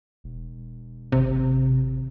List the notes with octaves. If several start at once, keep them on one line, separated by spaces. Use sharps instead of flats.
E1
G#1 C3